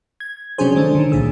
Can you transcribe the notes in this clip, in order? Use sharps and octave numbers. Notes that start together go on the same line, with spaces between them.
G#6
C3 F#3 C#4 D4 G#4 C5
D#3 G#3 A3 D4
D3 D#3
C2 A#2 G#4 E6